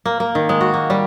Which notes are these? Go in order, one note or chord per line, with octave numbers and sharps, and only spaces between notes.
A#3
A#3
D#3
G#3
F#4
A#3
G3